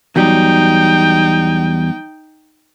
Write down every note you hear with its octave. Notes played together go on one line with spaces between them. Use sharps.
E2 F#3 G3 D#4 G5